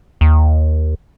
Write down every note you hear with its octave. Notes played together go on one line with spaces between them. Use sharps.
D#2